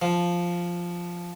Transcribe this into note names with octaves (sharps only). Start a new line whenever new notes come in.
F3